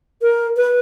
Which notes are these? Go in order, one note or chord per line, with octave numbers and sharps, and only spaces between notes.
A#4
B4